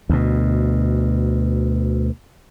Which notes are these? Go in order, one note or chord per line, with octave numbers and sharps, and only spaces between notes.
D2 B2